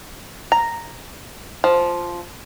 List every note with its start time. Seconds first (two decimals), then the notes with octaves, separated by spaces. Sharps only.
0.52 A#5
1.64 F3